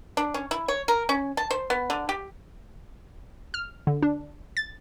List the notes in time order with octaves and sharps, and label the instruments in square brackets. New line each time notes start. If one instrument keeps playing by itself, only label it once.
[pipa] D4
C#4
E4
C#5
A#4
C#4
A5
C5
B3
D3
G4
[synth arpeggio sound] F6
D3
D4
A6